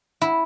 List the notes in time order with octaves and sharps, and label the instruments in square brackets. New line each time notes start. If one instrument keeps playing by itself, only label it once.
[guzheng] E4